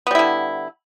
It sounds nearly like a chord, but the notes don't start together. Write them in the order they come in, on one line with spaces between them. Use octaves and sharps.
B3 G3 E4 D3